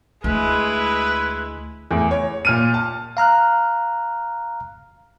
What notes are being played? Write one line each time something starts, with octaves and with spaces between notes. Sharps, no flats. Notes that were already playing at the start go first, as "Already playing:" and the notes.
D2 G#3 E4 B4
E2 A2
C#5
A#2 F6 D#7
A5
F5 A#5 F6 F#6